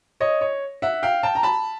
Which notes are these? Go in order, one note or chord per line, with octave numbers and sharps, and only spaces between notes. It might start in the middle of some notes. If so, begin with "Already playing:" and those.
C#5 D#5
C#5
E5 F#5
F5 G5
G5 A5
A#5
A5 B5